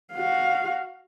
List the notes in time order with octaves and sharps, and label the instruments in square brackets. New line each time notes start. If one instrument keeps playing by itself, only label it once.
[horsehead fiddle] F#4 F5